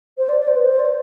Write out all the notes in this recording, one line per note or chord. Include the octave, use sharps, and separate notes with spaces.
C5
D5
D5
C5
B4
C5
D5
C5